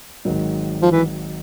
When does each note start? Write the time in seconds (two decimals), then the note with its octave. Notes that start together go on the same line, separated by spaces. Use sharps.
0.25 G#1 G#2 D#3 F#3
0.82 F3
0.91 E3